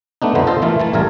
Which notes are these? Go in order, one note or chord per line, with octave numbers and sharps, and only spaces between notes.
A3 B3 D4 D#4
F2 D3 B3 C5
F4 A4 C5 D#5 F5
E3 A3 A#3 F4
E3 A3 A5
A1 G3 A4 A#4 G#5